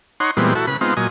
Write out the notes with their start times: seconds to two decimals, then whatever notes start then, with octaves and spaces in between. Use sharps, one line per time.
0.20 D#4 C#5 F#5 C6
0.37 A#2 E3 G3 G#3 B3 C4
0.55 E4 F#4 A4
0.67 C#3 B4 B5
0.81 G#3 B3 C4 D#4 F4
0.97 A#2 F#3 D#5 G#5